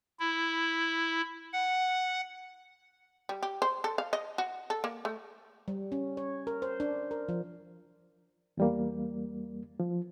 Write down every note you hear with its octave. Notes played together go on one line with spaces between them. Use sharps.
E4
F#5
G3
G4
C5
A4
F5
D#5
F#4
A4
A#3
A3
G3
C#4
C#5
A#4
C5
D4
A#4
F3
E2 G3 A#3
F3